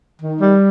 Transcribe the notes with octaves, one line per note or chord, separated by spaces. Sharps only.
D#3
G3